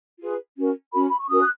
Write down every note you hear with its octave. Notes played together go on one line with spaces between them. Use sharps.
F4 G#4 B4
C#4 F#4 A#4
C#4 F#4 A#4 B5
B5
C#6
C#4 F#4 A#4 D#6
F#6